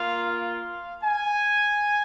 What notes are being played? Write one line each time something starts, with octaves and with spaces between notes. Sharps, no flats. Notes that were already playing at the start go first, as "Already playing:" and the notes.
Already playing: A#3 F4 F5
F5
G#5